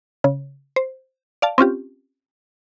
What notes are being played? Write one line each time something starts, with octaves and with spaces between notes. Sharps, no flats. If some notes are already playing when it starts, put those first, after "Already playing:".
C#3
C5
D5 F5 A5
C4 C#4 F4 G4